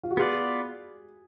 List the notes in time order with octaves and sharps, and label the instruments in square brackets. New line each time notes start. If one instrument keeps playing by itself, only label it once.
[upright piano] F4
F#4
[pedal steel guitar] B3 F4 B4 D5 [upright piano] G#4